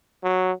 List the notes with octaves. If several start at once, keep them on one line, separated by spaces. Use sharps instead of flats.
F#3